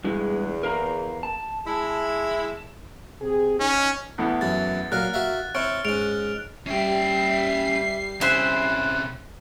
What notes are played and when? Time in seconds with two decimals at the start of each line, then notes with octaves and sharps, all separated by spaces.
0.04 E2 G2 E3 G#3
0.63 A#4 F5 A#5
1.23 A5
1.66 G#3 E4
3.22 C3 C4 G#4
3.60 C#4 D#4
4.18 E2 A2 B3
4.41 F#2 E3 A6
4.92 A#2 F#3 A#4 F5 F#6
5.14 F#4 E5 F5
5.55 C4 E4 C#5 F6 D7
5.85 G#2 C#4 D7 F7
6.67 G3 C#4 E5 G5 C7
8.21 C3 C#4 E4 C5 F#6